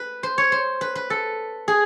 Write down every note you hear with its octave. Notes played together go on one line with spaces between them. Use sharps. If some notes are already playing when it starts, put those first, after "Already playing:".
Already playing: B4
C5
C#5
C5
B4
B4
A4
G#4